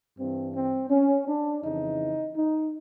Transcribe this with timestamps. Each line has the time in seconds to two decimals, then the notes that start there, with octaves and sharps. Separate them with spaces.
0.18 G2 E3 C4
0.55 C4
0.91 C#4
1.28 D4
1.64 F2 C#3 E3 D#4
2.37 D#4